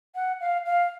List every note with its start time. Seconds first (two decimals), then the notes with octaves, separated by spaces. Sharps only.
0.15 F#5
0.41 F5
0.66 F5